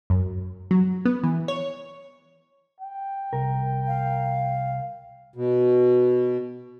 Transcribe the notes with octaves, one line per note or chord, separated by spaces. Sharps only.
F#2
F#3
B3
E3
C#5
G5
C2 A#4
F5
B2